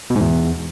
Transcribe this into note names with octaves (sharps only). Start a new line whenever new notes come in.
B2
G#2
E2